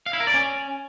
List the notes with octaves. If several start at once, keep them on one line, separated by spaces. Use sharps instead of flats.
F5
E4
A#4
D5
C#4